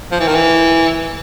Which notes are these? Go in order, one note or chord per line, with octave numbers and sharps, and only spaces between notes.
F3
E3
D#3
E3